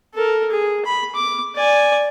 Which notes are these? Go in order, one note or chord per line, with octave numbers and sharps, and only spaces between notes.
A4 A#4
G#4
B5
D6
D5 G#5